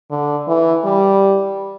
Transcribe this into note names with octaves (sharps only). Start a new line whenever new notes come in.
D3
E3
G3